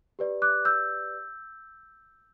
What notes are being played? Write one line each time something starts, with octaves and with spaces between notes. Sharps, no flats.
G4 B4 D5
D6 F#6
E6 G6